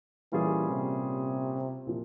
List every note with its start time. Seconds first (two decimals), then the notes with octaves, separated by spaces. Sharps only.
0.32 A#2 E3 G3 C#4 F4 G#4
0.70 C3
1.87 A#2 F3